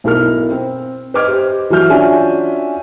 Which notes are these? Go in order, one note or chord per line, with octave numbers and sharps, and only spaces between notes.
B1 E4 A#4 F6
C4
B4 D#5 D6 F6 G#6
G4 C5 D#5
E3 F#3 F#4 E5 F6 G6
C#4 D4 F4 F#4 E5 G#5